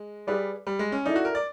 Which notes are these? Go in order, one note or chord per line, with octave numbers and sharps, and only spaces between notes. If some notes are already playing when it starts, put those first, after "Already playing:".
Already playing: G#3
G3 G#4 B4 D5 F5
G3
G#3
C#4
D#4 E4 A4 D5
F#4
A#4
D5